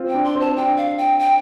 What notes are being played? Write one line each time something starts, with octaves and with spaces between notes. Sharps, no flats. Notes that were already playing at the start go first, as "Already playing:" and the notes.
Already playing: C4 F4
G5
D4
C6
C4 A5
D4 G5
F5
G5
G5